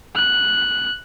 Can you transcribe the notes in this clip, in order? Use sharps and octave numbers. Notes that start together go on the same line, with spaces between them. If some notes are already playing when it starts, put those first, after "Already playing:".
F#6